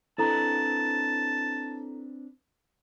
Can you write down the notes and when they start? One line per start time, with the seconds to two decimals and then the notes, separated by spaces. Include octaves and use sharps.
0.18 C4 D4 E4 A4 B4 A5 A#5